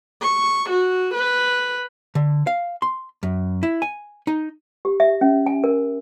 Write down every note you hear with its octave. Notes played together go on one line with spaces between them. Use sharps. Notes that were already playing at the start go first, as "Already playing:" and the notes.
C#6
F#4
B4
D3
F5
C6
F#2
E4
G#5
D#4
G4
E5
C#4
G#5
A#4